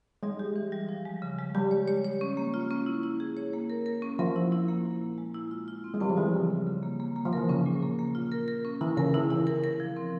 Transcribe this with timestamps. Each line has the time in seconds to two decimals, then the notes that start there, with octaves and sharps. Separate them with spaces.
0.23 G3 G#3
0.39 G4
0.56 E3
0.72 G3
0.89 F3
1.05 G#3
1.22 C#3
1.39 G#3
1.55 G3 G4
1.71 C#5
1.88 C#5
2.05 C#5
2.21 C#4
2.37 A#3
2.54 F4
2.71 C#4
2.86 E4
3.03 E4
3.20 G#4
3.37 C#5
3.53 A#3
3.70 A#4
3.86 A#4
4.02 C#4
4.19 F3 A#4
4.36 E4
4.52 E4
4.68 A#3
4.85 A#2
5.02 A#2
5.18 G#3
5.34 E4
5.51 F4
5.68 F4
5.84 C4
5.94 G#3
6.01 G3 C4
6.09 F3
6.17 E3 G3
6.34 C#3
6.50 C#3
6.67 C#3
6.83 A#3
7.00 A#3
7.16 A#3
7.25 F3
7.33 E3 A#4
7.49 C#3 C#4
7.66 A#2
7.82 A#3
7.99 A#3
8.15 F4
8.32 A#4
8.48 A#4
8.65 C#4
8.81 E3 E4
8.97 C#3 A#4
9.14 E3 E4
9.31 C#3 E4
9.47 A#4
9.64 A#4
9.80 F3
9.97 C4